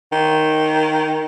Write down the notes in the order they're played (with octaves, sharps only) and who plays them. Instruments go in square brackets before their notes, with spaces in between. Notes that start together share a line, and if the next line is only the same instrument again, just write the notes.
[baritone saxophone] D#3